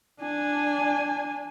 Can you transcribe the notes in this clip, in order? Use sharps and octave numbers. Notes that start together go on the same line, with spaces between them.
D4 G#5